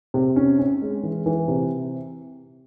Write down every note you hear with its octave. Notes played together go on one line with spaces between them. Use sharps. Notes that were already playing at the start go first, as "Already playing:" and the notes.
C3
C#4
C#4
G#3
E3
E3
C3